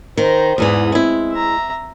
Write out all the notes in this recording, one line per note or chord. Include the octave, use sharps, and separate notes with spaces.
D#3 C5 A#5
E2 G#2 E3 D5 D#6
G#3 C4 E4
E5 A#5